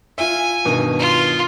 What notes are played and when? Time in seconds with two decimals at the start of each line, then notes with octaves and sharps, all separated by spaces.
0.18 F4 E5 G#5
0.65 G2 B2 D#3
0.99 F4